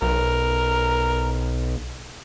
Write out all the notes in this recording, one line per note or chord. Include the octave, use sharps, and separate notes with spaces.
B1 A#4